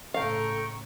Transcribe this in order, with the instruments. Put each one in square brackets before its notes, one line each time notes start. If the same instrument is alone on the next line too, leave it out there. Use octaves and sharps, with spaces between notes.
[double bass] A2 C#3 [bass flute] A4 [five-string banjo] F5 [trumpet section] G5 A#5 C#6